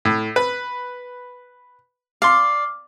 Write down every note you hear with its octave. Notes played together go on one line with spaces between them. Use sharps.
A2
B4
D5 F5 C6